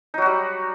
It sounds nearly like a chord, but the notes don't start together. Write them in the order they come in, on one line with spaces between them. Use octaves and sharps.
D#4 F#3 F#4 G3